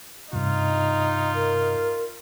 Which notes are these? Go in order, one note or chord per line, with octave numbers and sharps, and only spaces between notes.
G2 C3 D#4 F4
A#4